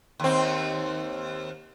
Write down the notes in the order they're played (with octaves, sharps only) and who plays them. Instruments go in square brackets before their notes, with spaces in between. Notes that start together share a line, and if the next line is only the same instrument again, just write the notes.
[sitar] D#2 C4